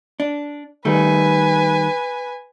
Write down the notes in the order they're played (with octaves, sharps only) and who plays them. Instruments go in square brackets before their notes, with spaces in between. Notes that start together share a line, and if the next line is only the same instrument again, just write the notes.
[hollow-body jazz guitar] D4
[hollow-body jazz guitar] D#3 G3 A3 [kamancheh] B4 G#5